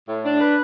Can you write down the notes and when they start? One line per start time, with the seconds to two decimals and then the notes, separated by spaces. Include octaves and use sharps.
0.08 A2
0.25 D4
0.41 B4